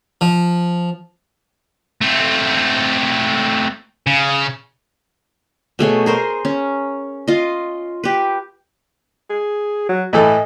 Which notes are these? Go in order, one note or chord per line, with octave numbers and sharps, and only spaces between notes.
F3
A3 C4
C#3
B2 A3 G#4 C#5
G#4 A#4 C5
C#4
F4 D#5
G4 B4
G#4
F#3
A2 E3 A4 D#5